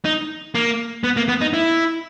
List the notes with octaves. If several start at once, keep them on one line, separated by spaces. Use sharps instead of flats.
D#4
A#3
B3
A#3
B3
D#4
E4